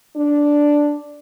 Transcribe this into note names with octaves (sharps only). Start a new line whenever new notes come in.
D4